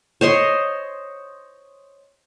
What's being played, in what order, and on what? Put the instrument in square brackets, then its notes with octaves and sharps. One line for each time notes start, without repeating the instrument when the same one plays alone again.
[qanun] C5 C#5 D#5 C6